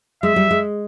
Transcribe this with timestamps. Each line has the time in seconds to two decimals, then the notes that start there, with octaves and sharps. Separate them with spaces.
0.22 G#3 E5
0.36 G3
0.51 G#3